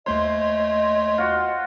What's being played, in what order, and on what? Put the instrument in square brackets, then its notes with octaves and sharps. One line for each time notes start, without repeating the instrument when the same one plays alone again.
[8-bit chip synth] D#2 A3 C#5 [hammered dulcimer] C5 [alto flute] D#5 [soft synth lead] C6
[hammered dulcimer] F4 F#4